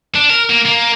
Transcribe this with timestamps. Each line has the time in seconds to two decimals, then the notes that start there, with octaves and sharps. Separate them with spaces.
0.15 D4
0.30 A#4
0.50 A#3
0.65 A#3